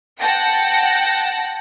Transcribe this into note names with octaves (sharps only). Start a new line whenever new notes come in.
F#5 G5 A5 A#6